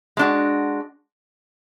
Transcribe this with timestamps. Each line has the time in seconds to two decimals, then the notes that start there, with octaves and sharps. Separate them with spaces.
0.17 G#3 D4 F#4